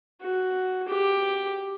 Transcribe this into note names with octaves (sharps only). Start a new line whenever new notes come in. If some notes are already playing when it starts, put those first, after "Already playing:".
F#4
G4